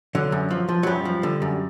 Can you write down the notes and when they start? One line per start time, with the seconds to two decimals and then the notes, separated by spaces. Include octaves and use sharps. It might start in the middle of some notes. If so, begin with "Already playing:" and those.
0.15 D3 F#3
0.32 F#2
0.51 F3
0.69 F3
0.83 F#3
0.87 F#2 G3
1.05 F3
1.23 D3
1.42 F#2